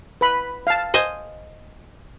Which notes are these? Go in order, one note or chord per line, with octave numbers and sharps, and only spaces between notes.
B4 B5
F5 A5
C5 D#5 G#5